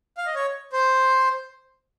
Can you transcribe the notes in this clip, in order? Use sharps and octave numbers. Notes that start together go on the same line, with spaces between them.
F5
D#5
C#5
C5